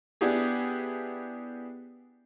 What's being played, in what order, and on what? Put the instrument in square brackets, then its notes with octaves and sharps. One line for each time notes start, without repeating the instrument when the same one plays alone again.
[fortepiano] B3 D4 E4 G4 G#4